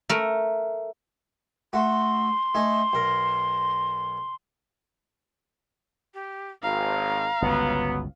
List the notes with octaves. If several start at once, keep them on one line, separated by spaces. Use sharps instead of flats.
A3 A#4
A3 F#4 C6
A3 D#4 G#5
B1 A#4
G4
G#1 F5 A#5
G1 C#2 F#3 B3